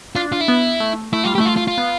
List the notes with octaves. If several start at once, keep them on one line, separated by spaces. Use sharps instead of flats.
D4 F4
F4
E4
B3
A3
A3 E4
G3 F4
G4
A3 E4
F4
F4
F4
B3